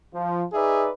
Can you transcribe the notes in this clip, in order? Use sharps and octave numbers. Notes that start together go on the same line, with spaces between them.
F3
D#4 G#4 B4 D5 E5